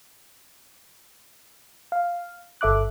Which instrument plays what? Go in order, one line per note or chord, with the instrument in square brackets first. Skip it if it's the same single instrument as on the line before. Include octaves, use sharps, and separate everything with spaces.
[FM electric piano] F5
G1 A4 E5 D6 F#6